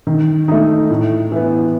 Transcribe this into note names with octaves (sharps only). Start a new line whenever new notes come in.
D#3
A3 D#4
A2
E3 B3